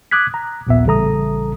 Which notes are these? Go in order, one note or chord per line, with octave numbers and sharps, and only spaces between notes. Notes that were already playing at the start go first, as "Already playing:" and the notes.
D6 D#6 F#6 G#6 B6
A#5
A#1 D#2 A#2 B3 E5
A1 C#3 G3 A4 A#5 D#6